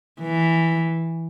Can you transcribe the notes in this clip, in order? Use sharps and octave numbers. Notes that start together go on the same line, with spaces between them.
E3